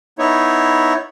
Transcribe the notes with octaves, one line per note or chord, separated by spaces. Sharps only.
B3 D#4 E4 C#5